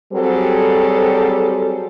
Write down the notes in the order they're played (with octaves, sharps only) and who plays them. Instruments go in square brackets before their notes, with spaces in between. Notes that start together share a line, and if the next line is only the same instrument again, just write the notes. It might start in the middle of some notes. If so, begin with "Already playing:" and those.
[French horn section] F#3 G3 C4 G#4 A4 C5